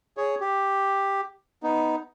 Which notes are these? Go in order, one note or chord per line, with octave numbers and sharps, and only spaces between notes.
G#4 C#5
G4
B3 D#4